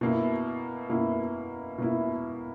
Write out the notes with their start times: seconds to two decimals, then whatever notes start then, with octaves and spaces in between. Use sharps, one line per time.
0.01 B2 A#3 E4
0.89 B2 A#3 E4
1.78 B2 A#3 E4